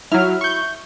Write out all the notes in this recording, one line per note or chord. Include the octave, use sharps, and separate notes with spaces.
F#3 E4 F6
C#6 G6